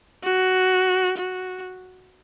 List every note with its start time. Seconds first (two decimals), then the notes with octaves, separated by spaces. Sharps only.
0.23 F#4
1.18 F#4